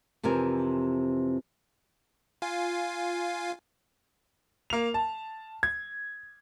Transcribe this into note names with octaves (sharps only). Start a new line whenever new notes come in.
F2 C3 E3 A#4 G#5
F4 F5 G#5
A#3 F7
A5
G#6